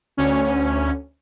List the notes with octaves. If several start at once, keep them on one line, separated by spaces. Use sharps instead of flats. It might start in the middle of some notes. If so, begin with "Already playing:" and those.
D2 C#4